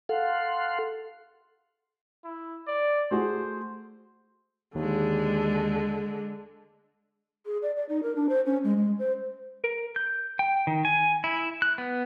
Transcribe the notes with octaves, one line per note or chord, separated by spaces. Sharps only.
A4 F5 F#5 C6
E4
D5
A3 F#4 G#4 C5
D#2 D3 G#3
G#4
D5
D5
D#4
A#4
D4
C5
C#4
G#3
G#3
C5
A#4
G6
G5
D#3
G#5
E4
F#6
B3